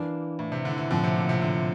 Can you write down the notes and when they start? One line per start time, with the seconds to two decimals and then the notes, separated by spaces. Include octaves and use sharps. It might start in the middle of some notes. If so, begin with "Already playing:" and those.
Already playing: E3 A#3 D4
0.39 A2
0.52 C3
0.65 D3
0.78 E3
0.90 A2 D3 F3 C4
1.04 C3
1.16 A#2
1.29 C3
1.42 D3